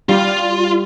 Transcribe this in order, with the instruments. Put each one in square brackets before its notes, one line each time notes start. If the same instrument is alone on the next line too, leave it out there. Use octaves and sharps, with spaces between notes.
[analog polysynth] G3 [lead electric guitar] F4